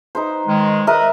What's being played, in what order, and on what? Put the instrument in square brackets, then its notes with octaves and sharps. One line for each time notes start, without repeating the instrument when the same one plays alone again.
[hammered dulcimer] D#4 B4 C5
[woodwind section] D#3 G#3
[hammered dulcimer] A#4 E5 [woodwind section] B4 D#5